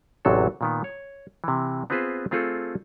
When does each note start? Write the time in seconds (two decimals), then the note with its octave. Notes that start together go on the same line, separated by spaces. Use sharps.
0.25 A1 E2 C3 F#3 A4
0.61 A#2 D#3 B3
0.84 C#5
1.44 C3 E3
1.90 B3 C4 F4 G#4 B4 C5
2.31 A3 C4 F4 G#4 A4